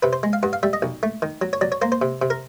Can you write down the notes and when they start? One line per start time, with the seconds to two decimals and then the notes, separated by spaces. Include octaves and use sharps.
0.03 C3 B4
0.13 C5
0.23 G#3
0.33 F5
0.43 G2 F#5
0.53 F5
0.63 G3 E5
0.73 D#5
0.82 B1
1.03 A3
1.22 D#3
1.42 F#3
1.53 C#5
1.61 F#3 D5
1.72 C#5
1.82 A#3 C5
1.92 C5
2.02 C3
2.22 C3
2.30 A#4